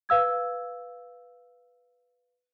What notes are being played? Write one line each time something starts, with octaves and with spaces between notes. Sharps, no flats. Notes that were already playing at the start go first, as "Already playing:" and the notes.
B4 F5 E6 G#6